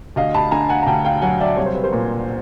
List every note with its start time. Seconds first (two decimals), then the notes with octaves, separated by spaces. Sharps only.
0.16 D2 D#5 F5
0.34 A5 B5
0.51 D3 G#5 A#5
0.69 F#5 G#5
0.83 A#5
0.87 D2 G5 A5
1.05 F5 G5
1.22 F#3 F#5 G#5
1.40 D5 E5
1.57 C2 C#5
1.66 C5
1.75 B4
1.84 A#4 C5
1.93 A#2